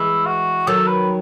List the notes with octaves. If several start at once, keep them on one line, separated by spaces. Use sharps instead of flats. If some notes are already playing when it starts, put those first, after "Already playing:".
Already playing: E3 G#3 E4
F#4
D#3 F#3 A4
B4